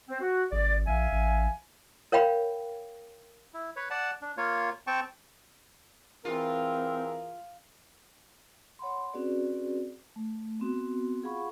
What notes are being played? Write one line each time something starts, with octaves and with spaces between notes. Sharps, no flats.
C4
F#4
G#1 G#4 D5
A#1 E5 F5 G#5
A1
A#4 C#5 F5 G5 B5
E4
B4 C#5
D5 F#5 A5
D4
A#3 F4 C#5
C4 G5 A5 C#6
E3 C4 F4 G#4 A#4
C#5 F#5 B5 C6
C4 C#4 F#4 G#4 B4 D5
A3
B3 C4 F#4
F4 G#4 F5 F#5 B5 C#6